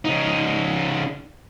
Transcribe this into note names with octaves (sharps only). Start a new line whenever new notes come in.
C#3 D#4